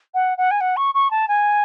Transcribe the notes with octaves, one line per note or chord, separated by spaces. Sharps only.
F#5
F#5
G#5
F#5
C#6
C#6
A5
G#5